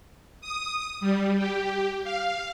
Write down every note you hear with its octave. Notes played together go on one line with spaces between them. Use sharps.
D#6
G3
G4
F5